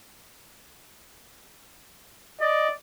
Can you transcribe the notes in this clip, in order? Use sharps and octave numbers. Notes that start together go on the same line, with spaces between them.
D5 D#5